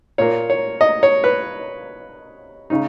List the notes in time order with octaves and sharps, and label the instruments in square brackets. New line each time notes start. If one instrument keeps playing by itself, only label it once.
[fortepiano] A#2 A#3 C#5
C#5
D#5
C#5
B4
C#3 D#4